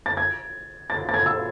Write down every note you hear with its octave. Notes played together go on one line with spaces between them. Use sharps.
A6
G#6
A6
A6
G#6
E6